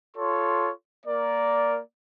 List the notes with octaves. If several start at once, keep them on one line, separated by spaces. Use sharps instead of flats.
F4 A4 C#5 C6
A#3 A#4 D5